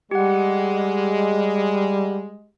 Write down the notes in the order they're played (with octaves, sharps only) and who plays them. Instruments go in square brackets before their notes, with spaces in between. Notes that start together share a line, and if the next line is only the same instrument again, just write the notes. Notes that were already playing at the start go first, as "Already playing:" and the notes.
[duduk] G3 [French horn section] G#3 [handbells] G4 F#5